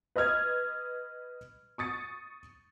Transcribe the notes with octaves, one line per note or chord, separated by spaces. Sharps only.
B4 D#5 D#6 F6 G#6
C#6 D#6 A6 C#7